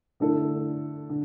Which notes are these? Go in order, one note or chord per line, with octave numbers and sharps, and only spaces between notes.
D3 A3 E4 A4
D3